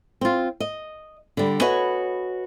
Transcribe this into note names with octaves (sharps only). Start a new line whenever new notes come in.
C4 F4
D#5
D3 G3
F#4 B4 C#5 D#5 G#5